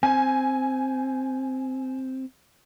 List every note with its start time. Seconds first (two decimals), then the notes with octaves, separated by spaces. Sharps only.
0.03 C4 G#5